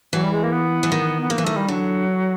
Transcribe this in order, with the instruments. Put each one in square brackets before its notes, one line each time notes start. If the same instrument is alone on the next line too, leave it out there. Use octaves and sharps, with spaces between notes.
[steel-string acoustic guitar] E3 [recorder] F#3
[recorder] G3
G#3
A#3
B3
[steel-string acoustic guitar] E3
D#3
[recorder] B3
[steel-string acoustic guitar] D#3 [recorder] A#3
[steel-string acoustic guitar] E3
[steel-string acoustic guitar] D#3 [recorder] A3
[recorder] G3
[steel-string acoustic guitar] D3 [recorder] F#3